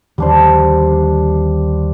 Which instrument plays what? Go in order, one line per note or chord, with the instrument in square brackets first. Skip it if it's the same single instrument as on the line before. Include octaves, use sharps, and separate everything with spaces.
[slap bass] D#2 D3 F3 [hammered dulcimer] G3 D4 C5